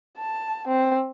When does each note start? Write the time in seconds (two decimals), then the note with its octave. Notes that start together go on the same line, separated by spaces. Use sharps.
0.18 A5
0.68 C4